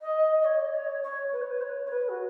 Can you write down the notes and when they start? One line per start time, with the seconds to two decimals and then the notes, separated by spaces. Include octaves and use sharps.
0.01 D#5
0.41 D#5
0.45 C#5
0.67 D#5
0.74 C#5
1.03 C#5
1.32 B4
1.41 C#5
1.51 B4
1.61 C#5
1.86 C#5
1.90 B4
2.09 F#4